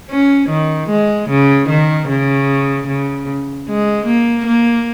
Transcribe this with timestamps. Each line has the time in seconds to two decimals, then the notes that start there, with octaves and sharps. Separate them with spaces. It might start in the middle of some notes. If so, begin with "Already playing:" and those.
0.10 C#4
0.50 D#3
0.90 G#3
1.30 C#3
1.69 D#3
2.08 C#3
2.87 C#3
3.68 G#3
4.07 A#3
4.47 A#3